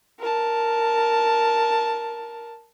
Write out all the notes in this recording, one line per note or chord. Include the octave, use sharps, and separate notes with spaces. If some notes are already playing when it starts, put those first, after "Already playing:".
A#4 A5